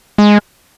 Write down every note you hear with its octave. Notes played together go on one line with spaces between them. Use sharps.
G#3